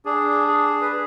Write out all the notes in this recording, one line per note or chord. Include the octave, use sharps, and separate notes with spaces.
D4 G#4
G#4
B4
G#4